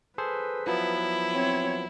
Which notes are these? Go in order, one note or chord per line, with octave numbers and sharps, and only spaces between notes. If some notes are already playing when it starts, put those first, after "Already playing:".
G#4 A4 B4 C5
F3 F#3 B3 E4
C4 C#5